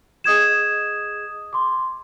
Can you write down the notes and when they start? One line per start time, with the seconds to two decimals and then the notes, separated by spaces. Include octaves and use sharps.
0.24 G#4 D#5 D#6 G#6 E7
1.53 C6 D6